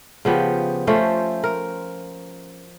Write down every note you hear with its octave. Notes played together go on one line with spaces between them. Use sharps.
C#3 F3 B3 G4
F3 A3 C#4 C5
A#4